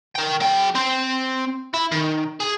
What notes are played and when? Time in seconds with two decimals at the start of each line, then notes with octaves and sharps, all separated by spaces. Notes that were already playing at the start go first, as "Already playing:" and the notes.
0.16 A#4 G5
0.41 F#3 G5
0.75 C4 C5
1.74 E4
1.91 D#3
2.40 G#4